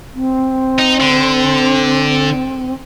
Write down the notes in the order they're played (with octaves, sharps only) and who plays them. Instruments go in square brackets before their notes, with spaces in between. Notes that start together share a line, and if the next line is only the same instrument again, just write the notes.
[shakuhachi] C4
[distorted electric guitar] D#4
D3